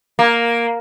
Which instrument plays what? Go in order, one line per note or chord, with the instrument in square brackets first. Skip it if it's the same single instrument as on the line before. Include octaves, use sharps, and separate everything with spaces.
[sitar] A#3